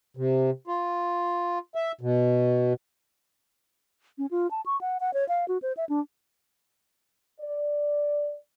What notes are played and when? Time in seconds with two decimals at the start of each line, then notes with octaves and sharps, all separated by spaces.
0.17 C3
0.67 F4
1.75 E5
2.01 B2
4.18 C#4
4.31 F4
4.51 A5
4.66 C#6
4.81 F#5
5.00 F#5
5.14 C#5
5.29 F5
5.48 F#4
5.62 C5
5.77 E5
5.89 D4
7.41 D5